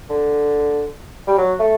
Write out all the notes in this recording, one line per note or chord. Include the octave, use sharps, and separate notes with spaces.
D3
G3
F#3
A3